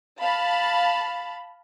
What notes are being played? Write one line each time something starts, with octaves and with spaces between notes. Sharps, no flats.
F5 A5 B5